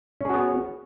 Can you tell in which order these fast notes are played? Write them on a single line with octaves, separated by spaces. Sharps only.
C#4 G#4 F#4 B3 C#5